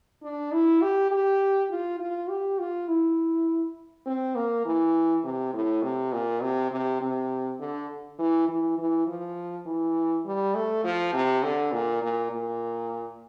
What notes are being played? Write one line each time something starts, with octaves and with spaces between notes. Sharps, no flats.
D4
E4
G4
G4
F4
F4
G4
F4
E4
C4
A#3
E3
C3
A2
C3
A#2
C3
C3
C3
D3
E3
E3
E3
F3
E3
G3
A3
F3
C3
D3
A#2
A#2
A#2